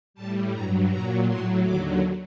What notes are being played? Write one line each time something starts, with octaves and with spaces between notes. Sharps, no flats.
A2 G3 A5
G2 F#3 A#5
A#2 F#3 A#5
A2 F#3 C6
D#2 D3 F#3 D6